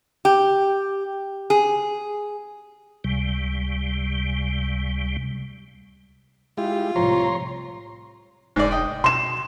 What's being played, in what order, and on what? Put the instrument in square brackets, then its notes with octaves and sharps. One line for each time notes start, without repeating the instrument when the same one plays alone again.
[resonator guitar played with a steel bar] G4
G#4
[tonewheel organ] C#2 C3 G3
[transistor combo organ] G#3 E4 G4 [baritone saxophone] F4
[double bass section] C2 A2 [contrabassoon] F3 [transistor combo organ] C#5 A#5 C6
[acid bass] F1 [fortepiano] G#2 D5
[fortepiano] D#5 G5
[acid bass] B2 [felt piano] C6 E7